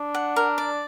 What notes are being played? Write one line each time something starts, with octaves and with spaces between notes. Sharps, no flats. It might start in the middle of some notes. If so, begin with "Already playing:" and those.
Already playing: D4
F#5
A#4
D5